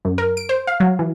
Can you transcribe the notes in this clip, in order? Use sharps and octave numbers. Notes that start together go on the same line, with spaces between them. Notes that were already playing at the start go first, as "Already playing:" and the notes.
F#2
A#4
D7
C5
F5
F#3
E3